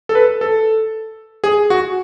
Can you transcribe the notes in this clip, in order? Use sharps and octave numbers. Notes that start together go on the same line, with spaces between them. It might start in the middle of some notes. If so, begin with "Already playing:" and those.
A4
B4
A4
G#4
F#4